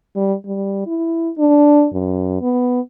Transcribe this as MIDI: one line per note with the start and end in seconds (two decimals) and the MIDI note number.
0.16 0.35 55
0.46 0.84 55
0.86 1.30 64
1.38 1.87 62
1.93 2.40 42
2.41 2.80 59